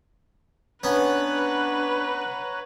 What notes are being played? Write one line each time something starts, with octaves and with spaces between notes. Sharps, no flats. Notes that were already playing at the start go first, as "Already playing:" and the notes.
B3 C#4 D4 B4 C#5 F#5 A#5